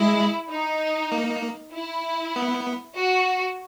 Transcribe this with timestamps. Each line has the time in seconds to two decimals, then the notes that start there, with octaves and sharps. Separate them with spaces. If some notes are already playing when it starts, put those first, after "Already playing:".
Already playing: G#3 E4
0.51 D#4
1.12 A#3
1.73 E4
2.36 B3
2.97 F#4